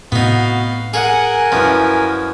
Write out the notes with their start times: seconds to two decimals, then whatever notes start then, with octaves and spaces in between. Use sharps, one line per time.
0.12 A2 C3 B3 D#4 F#4 F5
0.94 G#4 A#4 F#5 G#5
1.52 F#2 F3 E4 B4